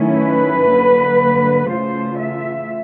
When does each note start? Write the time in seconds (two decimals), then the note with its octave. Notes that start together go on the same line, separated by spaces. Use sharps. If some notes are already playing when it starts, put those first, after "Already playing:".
Already playing: D#3 F#3 A3 C#4 E4
0.18 B4
0.69 D3 F#3 A#3
1.68 C#3 E3 A3 C#4 F4 C5
2.18 E5